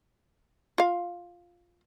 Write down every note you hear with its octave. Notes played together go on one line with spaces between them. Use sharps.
F4 F5